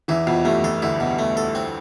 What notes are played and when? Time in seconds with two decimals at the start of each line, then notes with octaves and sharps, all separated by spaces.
0.08 E2 E3 E4
0.27 F2 B2 F3
0.45 G2 G3 A3
0.64 F2 F3 A4
0.82 D2 D3 E4
1.00 B2
1.19 A3
1.37 A4
1.55 C4